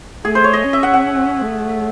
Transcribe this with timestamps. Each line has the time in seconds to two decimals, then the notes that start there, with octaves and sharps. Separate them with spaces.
0.25 A3 G#4
0.35 C5
0.44 C#5
0.53 D#5
0.64 C#4
0.73 E5
0.83 F#5
0.94 F#5
1.41 A3